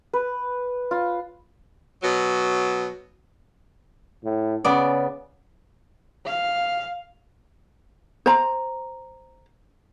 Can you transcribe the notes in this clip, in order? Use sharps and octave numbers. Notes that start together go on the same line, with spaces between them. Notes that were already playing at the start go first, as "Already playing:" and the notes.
B4
F4
B2 F#3
A2
C#3 B3 C#4 D5
F5
C5 A#5